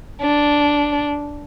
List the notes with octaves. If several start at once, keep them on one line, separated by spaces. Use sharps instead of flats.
D4